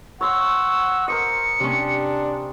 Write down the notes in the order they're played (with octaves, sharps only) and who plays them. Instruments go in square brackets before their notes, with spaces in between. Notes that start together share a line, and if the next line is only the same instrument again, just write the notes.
[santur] C#5 C6 C#6 [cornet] F#5 [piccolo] E6
[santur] A#4 C5 D#5 [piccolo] C#7
[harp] C3 C#4 [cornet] D4